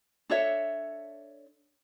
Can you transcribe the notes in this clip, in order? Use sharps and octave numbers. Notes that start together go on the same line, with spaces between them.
D4 A4 C#5 E5